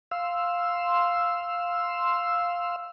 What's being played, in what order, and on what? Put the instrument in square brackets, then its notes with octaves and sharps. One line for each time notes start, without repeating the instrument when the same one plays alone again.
[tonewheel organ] F5 C6 E6